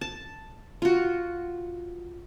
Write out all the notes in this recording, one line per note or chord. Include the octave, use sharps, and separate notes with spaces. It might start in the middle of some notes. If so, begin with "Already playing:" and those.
A5
F4 F#4